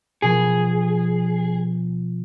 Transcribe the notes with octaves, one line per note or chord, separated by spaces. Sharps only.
B2 F3 G#4 B5